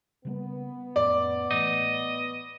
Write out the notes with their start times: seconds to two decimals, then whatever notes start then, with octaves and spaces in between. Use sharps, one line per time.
0.25 C#3 G3 A#3 B3
0.96 F2 A2 C#4 D5
1.51 A2 E3 A3 D#5